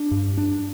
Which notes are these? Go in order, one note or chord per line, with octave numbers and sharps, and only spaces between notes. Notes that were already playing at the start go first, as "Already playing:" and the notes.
Already playing: D4
G2
D4